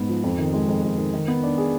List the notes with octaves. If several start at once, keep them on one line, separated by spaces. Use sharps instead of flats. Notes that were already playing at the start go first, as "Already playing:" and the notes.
Already playing: G#2 B3
F3
F2
D#3
G#3
F2
F2
D#3
D#3
B3
D4
G#4